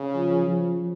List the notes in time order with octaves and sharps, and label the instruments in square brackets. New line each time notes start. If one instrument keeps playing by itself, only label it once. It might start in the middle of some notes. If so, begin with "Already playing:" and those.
Already playing: [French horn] C#3
[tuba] F3
F3